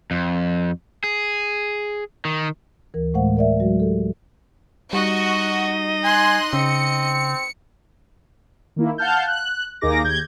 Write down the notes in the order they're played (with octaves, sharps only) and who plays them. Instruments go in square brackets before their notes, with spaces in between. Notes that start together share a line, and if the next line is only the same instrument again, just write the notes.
[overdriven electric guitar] F2
G#4
D#3
[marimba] D2 E3 A#4
A2 G#3 A3 C5 F5 F#5
A#4 D5 E5
F#3 G#3 F#4
G4 A4
[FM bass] G3 [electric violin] D#4 D#5 [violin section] F#4
[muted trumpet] G#5 [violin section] C6 F#6
[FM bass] C#3 [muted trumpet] C4 [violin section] C#7
[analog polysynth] D#3 A#3 E4
F5 F#5 A5 F6 G6
F#6
D#2 A#3 D#4 G#4 D6 A#6
D#2 G6 G#6